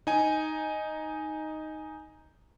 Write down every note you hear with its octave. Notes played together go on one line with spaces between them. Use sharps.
D#4 G#5